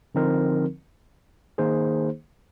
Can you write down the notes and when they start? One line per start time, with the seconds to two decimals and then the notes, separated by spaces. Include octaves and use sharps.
0.15 D3 F3 C4 D#4 A#4
1.58 D#3 A#3 D#4 G#4 C5